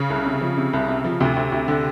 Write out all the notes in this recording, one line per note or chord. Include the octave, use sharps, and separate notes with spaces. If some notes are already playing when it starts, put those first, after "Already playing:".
Already playing: C#3
C2
C3
F3
C3
C2
C3
F3
D2 C3
D2
D2
D3